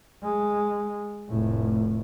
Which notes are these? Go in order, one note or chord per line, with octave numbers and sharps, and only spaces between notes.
G#3
F1 A2